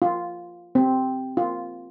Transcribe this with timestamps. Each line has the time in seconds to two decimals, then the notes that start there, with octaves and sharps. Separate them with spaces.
0.02 F4
0.75 C4
1.37 F4